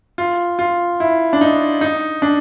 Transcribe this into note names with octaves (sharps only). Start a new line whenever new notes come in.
F4
F4
E4
D4
D#4
D#4
D4